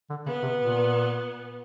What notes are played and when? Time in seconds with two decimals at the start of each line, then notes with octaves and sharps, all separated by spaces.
0.10 D3
0.26 C#3 B3
0.42 C3
0.58 A#2